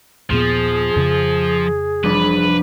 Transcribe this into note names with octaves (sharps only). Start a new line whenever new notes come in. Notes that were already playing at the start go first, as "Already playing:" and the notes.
D#2 A#2 F3 B3 G#4
F2 C#3
F1 F3 G3 D4 B4